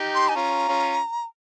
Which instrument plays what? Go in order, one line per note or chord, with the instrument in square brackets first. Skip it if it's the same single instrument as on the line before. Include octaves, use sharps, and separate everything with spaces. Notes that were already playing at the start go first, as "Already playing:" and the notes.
Already playing: [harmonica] D#4 G4
[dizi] C6
[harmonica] D#4 [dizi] G#5
[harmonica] C#4 F4 [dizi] A#5
[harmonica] C#4 F4